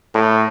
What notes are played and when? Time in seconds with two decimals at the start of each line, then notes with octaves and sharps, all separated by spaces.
0.15 A2